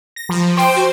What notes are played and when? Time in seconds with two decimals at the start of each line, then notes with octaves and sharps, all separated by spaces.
0.16 A#6
0.29 F3
0.57 C5 G5
0.76 F#4